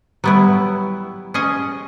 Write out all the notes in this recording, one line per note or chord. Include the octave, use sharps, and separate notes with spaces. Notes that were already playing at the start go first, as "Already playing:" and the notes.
F#3 G3 B3 E4
C#4 G#4 D#5